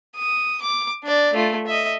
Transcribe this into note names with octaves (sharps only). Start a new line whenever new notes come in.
D#6
D6
D4 D5
A3 F4
D#5 E5